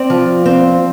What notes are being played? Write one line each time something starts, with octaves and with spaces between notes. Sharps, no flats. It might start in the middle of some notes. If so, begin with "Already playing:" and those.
Already playing: C4 D5
F3
C4